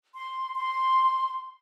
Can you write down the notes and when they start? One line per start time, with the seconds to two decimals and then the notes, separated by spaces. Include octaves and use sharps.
0.15 C6
0.56 C6